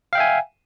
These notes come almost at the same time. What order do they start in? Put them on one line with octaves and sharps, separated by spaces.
F5 G5 E5 G#5